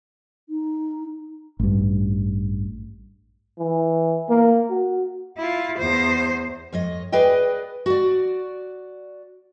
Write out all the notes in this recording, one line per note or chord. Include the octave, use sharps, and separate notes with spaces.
D#4
A1 G2
E3
A#3
F#4
E4 F4
E2 C5
F2 C#5 D#5
G#4 B4 D5 D#5 G5
F#4 D5